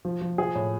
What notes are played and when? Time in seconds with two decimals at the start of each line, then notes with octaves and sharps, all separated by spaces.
0.05 F3
0.21 F3
0.38 F3 G#4
0.55 A2